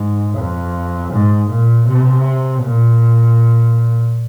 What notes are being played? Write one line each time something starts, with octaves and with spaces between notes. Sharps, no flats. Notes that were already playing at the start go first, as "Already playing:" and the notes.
Already playing: G#2
F2
G#2
A#2
C3
A#2